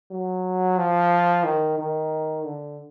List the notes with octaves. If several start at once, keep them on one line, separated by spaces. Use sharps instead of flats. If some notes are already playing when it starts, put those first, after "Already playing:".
F#3
F3
D#3
D#3
D3